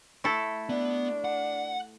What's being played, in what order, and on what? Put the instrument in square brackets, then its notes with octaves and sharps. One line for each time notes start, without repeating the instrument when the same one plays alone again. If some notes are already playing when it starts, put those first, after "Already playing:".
[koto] A3 E4 A4
[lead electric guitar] B3 [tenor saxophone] D4
[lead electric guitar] F#5